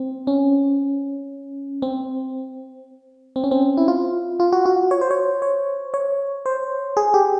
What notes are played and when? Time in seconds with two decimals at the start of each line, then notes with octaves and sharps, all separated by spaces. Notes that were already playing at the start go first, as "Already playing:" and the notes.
Already playing: C4
0.27 C#4
1.82 C4
3.36 C4
3.44 C#4
3.51 C4
3.77 E4
3.88 F4
4.40 F4
4.52 F#4
4.66 F#4
4.91 C#5
5.01 C5
5.11 C#5
5.42 C#5
5.94 C#5
6.46 C5
6.97 G#4
7.14 G4